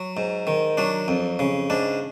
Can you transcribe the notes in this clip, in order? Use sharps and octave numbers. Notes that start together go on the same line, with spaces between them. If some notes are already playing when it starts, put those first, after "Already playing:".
Already playing: F#3
G#2
D#3
F#3 D4
F2
C#3
G#2 D4